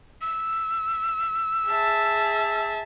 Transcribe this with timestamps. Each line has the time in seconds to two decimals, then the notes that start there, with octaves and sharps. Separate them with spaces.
0.21 E6
1.68 G#4 E5 A5